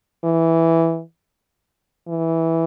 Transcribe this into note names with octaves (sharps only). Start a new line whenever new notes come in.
E3
E3